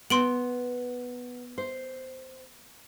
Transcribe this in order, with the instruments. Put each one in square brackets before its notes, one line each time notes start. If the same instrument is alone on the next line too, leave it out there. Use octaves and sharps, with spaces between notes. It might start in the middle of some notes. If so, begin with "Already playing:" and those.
[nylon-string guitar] B3 [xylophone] C6 D7 F#7
[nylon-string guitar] C5